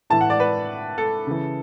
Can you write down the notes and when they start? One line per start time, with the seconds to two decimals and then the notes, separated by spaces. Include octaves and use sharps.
0.10 A2 E3 A5
0.21 F#5
0.30 D5
0.40 B4
0.98 A4
1.27 C#3 E3